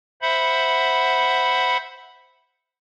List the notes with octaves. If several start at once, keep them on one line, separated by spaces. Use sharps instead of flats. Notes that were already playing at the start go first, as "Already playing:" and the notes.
C5 E5 F#5 B5